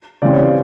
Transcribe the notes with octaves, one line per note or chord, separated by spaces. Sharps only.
C#3 E3 G3 C4 D5
C#5
C5